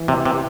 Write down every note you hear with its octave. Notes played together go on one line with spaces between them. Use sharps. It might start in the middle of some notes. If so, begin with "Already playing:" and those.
Already playing: E3
C3
C3